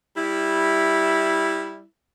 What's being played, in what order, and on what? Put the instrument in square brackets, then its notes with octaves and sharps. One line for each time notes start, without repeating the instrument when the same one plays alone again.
[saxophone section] G3 E4